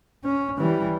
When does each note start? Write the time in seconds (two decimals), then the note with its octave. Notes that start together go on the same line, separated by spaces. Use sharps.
0.24 C#4
0.58 E3 G3